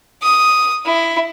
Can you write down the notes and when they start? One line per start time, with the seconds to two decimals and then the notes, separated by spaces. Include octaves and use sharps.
0.22 D#6
0.86 E4